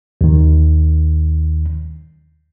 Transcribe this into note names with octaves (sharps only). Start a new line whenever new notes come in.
D#2 D#3